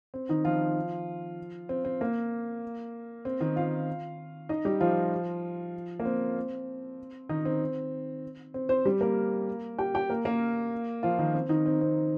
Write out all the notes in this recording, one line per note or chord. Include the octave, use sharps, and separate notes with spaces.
C4
D#3 D#4
F3 F4
C4
C4
A#3
C4
D#3 D#4
F4 F5
D#4 D#5
G3 G4
F3 F4
A#3
C4
D#3 D#4
C4
C4
C4 C5
G3 G4
A#3 A#4
G4 G5
G4 G5
A#3 A#4
A#3 A#4
F3 F4
D#3 D#4
C4
D#3 D#4
C4
C4